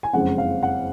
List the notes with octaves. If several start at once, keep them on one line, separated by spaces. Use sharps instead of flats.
G#5
F#1 F2 C#3 G#3 C#4 F#5
F5
F#5